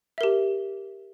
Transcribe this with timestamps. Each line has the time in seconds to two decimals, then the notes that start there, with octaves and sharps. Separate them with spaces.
0.18 E5
0.21 A#4
0.23 G4